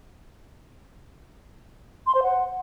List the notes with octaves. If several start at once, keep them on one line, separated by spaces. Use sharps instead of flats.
C6
C5
F#5